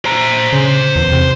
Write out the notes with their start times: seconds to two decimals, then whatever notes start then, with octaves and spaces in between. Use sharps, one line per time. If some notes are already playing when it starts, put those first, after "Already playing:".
0.05 C5 A#5
0.53 C#3
0.96 E2
1.12 C3